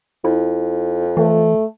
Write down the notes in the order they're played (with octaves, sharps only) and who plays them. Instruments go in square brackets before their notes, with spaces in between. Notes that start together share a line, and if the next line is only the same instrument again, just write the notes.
[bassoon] F2 [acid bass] E4
[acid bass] E3 [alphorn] A3